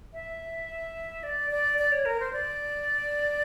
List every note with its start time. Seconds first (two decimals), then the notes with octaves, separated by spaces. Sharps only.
0.13 E5
1.23 D5
1.51 D5
1.78 D5
1.92 C#5
2.05 A#4
2.20 C5
2.33 D5